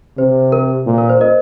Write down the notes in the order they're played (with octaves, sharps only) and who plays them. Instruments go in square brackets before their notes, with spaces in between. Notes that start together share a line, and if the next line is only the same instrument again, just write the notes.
[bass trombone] C3 [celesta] C5
[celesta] A#4
[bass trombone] A#2
[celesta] A#4
C5
A#4 D#5